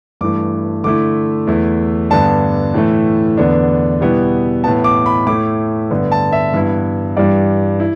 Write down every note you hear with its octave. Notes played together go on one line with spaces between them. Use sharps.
G2 E3 A3 D6
D3 A3 E4 D6
E2 E3 A3 E4
G2 D3 B3 D4 A5
A2 E3 A3
E2 D3 B3 D4
B2 G3 B3 E4
A2 E3 B3 A5
D6
B5
A2 A3 E4 D6
G2 D3 B3
A5
E5
G2 E3 B3 E4
G2 E3 G3 D5
E4